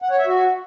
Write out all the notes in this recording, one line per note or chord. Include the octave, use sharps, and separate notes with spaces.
F#5
C#5
E5
F#4